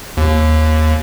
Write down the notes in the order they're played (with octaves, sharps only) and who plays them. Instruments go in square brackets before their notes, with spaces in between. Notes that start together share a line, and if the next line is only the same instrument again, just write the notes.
[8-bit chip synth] D#2